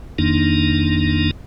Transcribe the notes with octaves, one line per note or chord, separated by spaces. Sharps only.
F2 D#3 A#3 D4 D#4